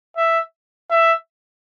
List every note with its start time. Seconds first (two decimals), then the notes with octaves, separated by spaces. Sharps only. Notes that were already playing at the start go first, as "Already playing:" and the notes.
0.17 E5
0.90 E5